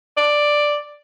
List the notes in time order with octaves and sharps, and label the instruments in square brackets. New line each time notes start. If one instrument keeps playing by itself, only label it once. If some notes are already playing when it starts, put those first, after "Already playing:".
[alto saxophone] D5